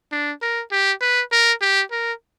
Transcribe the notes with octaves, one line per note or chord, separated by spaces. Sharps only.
D4
A#4
G4
B4
A#4
G4
A#4